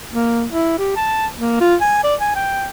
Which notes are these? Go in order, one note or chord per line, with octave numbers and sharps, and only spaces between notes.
A#3
E4
G4
A5
A#3
F4
G#5
D5
G#5
G5